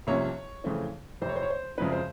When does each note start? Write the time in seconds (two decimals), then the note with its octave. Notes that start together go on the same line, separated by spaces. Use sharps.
0.07 C2 C3 F3 A#3 C#4 C#5
0.64 F2 C#3 E3 A3 C4
1.21 F1 F2 C3 C5
1.29 C#5
1.36 C5
1.43 C#5
1.50 C5
1.78 F#2 C#3 F3 G#3 C4 B4
1.92 C5